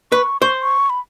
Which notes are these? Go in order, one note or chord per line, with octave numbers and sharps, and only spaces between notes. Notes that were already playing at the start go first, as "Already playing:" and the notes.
B4 C#6
C5 C#6
C#6
B5